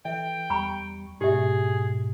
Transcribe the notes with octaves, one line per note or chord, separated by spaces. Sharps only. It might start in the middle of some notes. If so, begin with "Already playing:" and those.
E3 A4 E5 G5
E2 G3 A#5 B5 C#6
G#2 B2 G4 G#4 E5